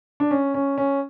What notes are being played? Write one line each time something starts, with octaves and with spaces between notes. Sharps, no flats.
D4
C#4
C#4
C#4